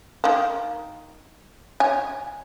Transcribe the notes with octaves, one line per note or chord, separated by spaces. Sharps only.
D#3 A#3
C#5 G#5